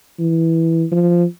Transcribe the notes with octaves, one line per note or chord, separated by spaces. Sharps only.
E3
F3